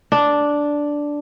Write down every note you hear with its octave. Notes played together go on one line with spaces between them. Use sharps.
D4